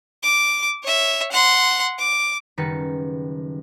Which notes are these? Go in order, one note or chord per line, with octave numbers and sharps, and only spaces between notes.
D6
C#5 E5
F#5 C6
D6
F#1 D#3 G3 D#4 B4 C#7